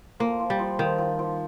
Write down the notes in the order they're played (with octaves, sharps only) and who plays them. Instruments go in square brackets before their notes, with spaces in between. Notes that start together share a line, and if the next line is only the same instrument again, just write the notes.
[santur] F3 [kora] A#3
[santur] F3
[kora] G3
[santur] F3
[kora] D#3 [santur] F3
[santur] F3
F3